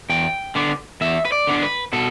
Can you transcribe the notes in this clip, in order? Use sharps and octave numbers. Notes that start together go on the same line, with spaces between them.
E2 G5
D3 B3 D4
E2 E5
B4
D5
D3 B3 D4
B4
B2 A4